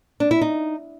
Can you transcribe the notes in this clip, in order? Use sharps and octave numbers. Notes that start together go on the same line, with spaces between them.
D4
E4
D#4